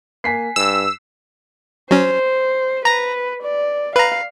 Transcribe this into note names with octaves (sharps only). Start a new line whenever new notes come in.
A#3 G#5 B6 C7
G2 E6
F#3 C#4 C5
B4 A#5 A#6
D5
B4 F5 A#5